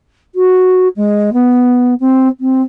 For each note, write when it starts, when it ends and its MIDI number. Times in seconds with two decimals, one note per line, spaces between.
0.35 0.88 66
0.96 1.30 56
1.33 1.94 59
2.00 2.28 60
2.40 2.62 60